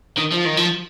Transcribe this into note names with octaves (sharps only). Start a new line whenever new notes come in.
D#3
F3
D#3
F3